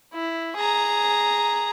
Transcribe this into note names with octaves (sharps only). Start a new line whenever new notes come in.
E4
G#4 A#5